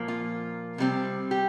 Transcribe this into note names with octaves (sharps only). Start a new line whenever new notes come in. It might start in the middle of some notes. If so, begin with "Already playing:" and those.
Already playing: A#2 F3 A#3
F4
C3 G3 C4
G4